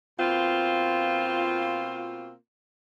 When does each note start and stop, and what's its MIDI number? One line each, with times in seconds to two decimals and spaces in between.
0.19 2.34 47
0.19 2.34 58
0.19 2.34 60
0.19 2.34 65